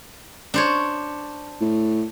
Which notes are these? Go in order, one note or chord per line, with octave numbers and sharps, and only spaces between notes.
D4 C5 C#5
A2